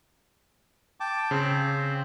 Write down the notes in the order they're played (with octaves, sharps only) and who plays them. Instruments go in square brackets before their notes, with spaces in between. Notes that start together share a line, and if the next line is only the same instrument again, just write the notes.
[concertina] G5 A5 D6
[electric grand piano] C#3 [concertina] C4 C5